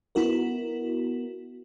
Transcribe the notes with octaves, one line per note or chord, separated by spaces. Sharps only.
B3 E4 F#4 A#4